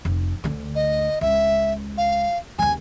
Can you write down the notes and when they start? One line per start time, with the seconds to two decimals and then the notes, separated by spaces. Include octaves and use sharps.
0.05 F1
0.44 D2 D3
0.75 D#5
1.21 C#2 E5
1.98 F5
2.59 D#2 C#3 G#5